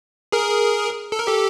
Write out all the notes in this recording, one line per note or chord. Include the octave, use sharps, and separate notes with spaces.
G#4 A#4
A4
A#4
G4 A4